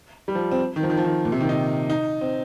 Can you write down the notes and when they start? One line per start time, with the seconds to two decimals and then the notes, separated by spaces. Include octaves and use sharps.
0.28 G3
0.35 F3
0.51 C4
0.76 D#3
0.83 F3
0.90 D#3
0.97 F3
1.04 D#3
1.25 A#2
1.32 C3
1.40 D#3
1.49 D#4
1.90 D#4
2.21 C4